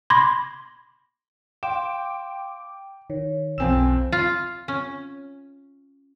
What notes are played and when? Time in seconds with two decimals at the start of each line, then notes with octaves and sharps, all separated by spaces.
0.10 B5 C6 D6 G#6 A#6
1.63 F5 G5 C6 D6 E7
3.10 D#3 C#5
3.58 B1 F2 C4 G5 G#5 E6 E7
4.12 F4
4.68 C#4